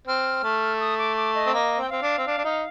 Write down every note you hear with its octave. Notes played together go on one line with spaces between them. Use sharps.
C4 F6
A3
D6
D#6
D6
D6
D#5
C4
A#3 D#5
C4 G5
C4 F5
D4
C4
D4
D4
D#4